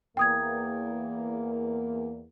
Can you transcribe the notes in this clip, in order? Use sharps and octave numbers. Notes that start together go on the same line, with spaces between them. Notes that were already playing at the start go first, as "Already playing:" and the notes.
E2 A#3 G5 D#6 G#6